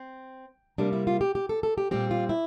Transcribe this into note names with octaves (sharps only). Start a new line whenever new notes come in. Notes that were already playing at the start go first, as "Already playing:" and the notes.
Already playing: C4
C3 G3 A#3 D4
E4
F4
G4
G4
A4
A4
G4
A#2 G3 C4 G4
F4
E4